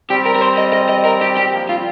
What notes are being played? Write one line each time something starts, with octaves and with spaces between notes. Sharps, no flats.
G3 C4 G4
A#4
A#4
C5
D#5
D#5
D#5
A#4
G4
G4
C4
F3 A#3
G3 C4 F4